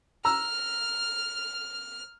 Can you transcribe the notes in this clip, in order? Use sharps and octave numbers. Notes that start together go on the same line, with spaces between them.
A#5 E6 F6